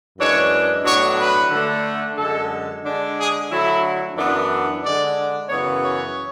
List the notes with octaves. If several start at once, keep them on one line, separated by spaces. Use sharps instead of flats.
F#2 E3 G#3 D4 C#5
A2 F#3 B3 D4 C#5
B4
D3 A3 D4
F#2 D3 G#3 A4
D3 G#3 D4
G#4
D3 F#3 A3 E4
F#2 E3 B3 D4
D3 G#3 D4 D5
F#2 C#3 E3 B3 C#5
C#5